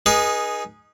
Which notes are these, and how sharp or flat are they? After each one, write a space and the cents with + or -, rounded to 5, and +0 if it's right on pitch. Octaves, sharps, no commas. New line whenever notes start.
D#4 -10 G#4 +0 B4 -40